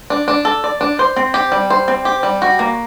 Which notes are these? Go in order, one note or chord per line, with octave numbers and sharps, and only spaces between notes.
D4
D4
A4
D5
D4
C5
C4
G4
G3
C5
C4
G4
G3
F#4
A#3